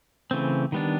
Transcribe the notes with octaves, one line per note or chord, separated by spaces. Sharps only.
C#3 E3 A3 C4
D#3 G3 B3 D4